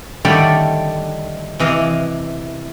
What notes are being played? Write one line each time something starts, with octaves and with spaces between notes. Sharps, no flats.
D3 D#3 G3 A3 C#5 D5
C3 E3 D#5 F5